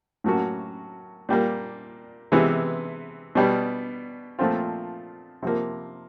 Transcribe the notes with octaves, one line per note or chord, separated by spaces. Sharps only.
A2 F#3 A#3 C#4 F#4
A#2 G3 A#3
C3 E3 G#3 B3
B2 G3 B3
A#2 F3 A3 C4 F4
C3 F3 A#3